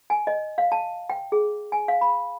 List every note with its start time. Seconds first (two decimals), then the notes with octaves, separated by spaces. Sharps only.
0.10 G#5
0.27 D#5
0.58 F5
0.72 A5
1.10 G5
1.32 G#4
1.72 G#5
1.88 F5
2.01 B5